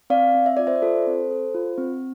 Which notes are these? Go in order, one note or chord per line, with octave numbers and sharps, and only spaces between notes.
C4 D5 F5
C4
E5
F4 D5
C5 E5
D5
F4 A4 C5
C4
A4
F4
C4